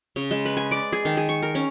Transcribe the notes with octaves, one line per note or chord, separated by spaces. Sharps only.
C#3
G#3
B4
G#5
D5
G#4
D#3
G#4
C#6
A#4
C#4